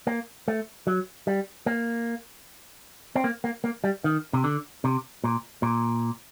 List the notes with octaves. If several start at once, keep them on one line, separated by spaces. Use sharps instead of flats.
A#3
A3
F#3
G3
A#3
C4
A#3
A#3
A#3
G3
D#3
C3
D3
C3
A#2
A#2